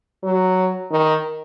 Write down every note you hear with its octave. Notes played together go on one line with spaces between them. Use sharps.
F#3
D#3